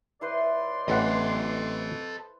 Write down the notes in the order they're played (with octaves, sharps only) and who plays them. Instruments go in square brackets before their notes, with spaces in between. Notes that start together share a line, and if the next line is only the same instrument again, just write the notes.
[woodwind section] C#2 D5 C6 [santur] E4 B4 C5
[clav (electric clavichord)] A1 E3 F#5 [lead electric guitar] A4 D#5